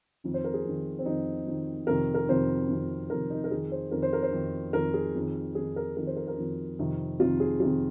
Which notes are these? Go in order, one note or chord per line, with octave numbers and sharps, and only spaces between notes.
F2 D#3
C5
A#4
G#4
F2 D#3
C4
F2 D#3 D#4
F2 D#3
F2 C3 D#3 A#4
A#4
F2 C3 D#3 C5
F2 C3 D#3
F2 C3 D#3 A#4
D#4
A#4
F2 D#3 G#4
C5
F2 D#3 A#4
C5
A#4
C5
F2 D#3
F2 D#3 A#4
G#4
F2 D#3
F2 D#3 G#4
A#4
F2 D#3 A#4
C5
A#4
A#4
F2 D#3
F2 C3 D#3
F2 C3 D#3 F4
G#4
F2 C3 D#3 F4